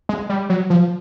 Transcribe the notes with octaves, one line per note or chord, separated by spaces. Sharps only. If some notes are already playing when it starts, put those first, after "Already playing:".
G#3
G3
F#3
F3